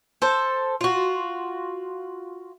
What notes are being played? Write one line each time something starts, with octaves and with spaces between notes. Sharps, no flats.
A4 C5
F4 F#4